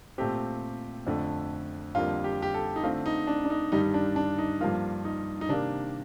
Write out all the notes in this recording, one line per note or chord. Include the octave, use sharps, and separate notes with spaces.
A#2 A3 C4 G4
F2 D3 A3
F2 D3 G3 A#3 F4
G4
G4
A4
D#4
D3 A3 C4 F4
D#4
D4
D4
D#4
G2 D#3 G3 D#4
D4
D4
D#4
G2 F3 A#3 F4
D#4
D#4
C3 D#3 A#3 D4